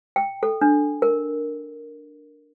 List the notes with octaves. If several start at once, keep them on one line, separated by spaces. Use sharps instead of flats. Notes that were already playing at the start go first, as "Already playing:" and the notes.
G5
A4
D4
A#4